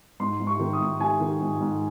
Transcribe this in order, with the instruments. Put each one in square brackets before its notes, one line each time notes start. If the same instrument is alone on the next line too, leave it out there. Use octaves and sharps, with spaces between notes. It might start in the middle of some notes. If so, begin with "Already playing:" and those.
[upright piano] G#2 C6
G#2
C#6
D#3
D#6
G#2
D#3 G#5
D#3
G#2
G#2